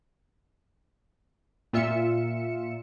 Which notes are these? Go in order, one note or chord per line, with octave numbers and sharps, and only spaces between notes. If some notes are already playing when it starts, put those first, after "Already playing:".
A#2 F4 E5 C#7 E7